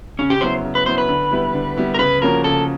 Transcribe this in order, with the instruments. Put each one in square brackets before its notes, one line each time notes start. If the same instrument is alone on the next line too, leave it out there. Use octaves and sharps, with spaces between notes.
[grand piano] C#3 [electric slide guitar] C#4
[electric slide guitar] G4
[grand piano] F#3 B3 E4 [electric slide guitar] C5
[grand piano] C#3
[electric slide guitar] B4
[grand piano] F#3 B3 E4 [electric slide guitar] C5
[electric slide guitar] B4
[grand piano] D3
G3 B3 E4
D3
G3 B3 E4
[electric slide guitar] A#4
[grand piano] C#3 [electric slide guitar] B4
[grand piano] F3 A#3 C#4 F#4 [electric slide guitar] A#4
[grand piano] C#3 [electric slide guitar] A4